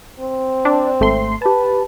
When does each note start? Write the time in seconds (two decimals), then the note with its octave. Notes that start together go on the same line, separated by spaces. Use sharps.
0.20 C4
0.65 D4
1.00 G#1 A3 C6
1.42 G4 B4 A5